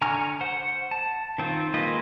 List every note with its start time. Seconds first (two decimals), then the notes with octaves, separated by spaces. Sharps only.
0.01 D3 G#5 A#5 C#6 F6
0.41 C5 F#5
0.91 A5
1.38 D#3 C4 F4
1.74 G#3 A#3 F4 B4 D#5